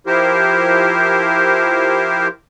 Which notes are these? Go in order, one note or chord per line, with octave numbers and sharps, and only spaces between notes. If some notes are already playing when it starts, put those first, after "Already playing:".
F3 E4 G4 A#4 C5